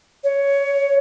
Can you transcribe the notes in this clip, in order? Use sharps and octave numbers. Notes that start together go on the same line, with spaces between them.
C#5